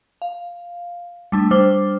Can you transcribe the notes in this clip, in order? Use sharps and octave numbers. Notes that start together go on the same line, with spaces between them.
F5
G3 A3 D4
G3 D4 C5 D6 F6